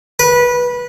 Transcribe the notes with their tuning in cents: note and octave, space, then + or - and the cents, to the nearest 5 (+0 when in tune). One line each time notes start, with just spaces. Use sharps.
B4 -20